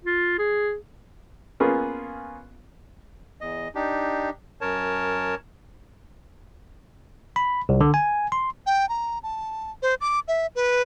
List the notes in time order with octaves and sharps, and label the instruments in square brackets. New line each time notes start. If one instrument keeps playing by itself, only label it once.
[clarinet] F4
G#4
[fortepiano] A#3 B3 C#4 F4 G#4
[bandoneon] E2 D#5
D4 D#4 G4
F#2 A#4 C#5 A5
[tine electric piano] B5
C2
D3
G#5
C6
[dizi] G5
A#5
A5
C5
D6
E5
B4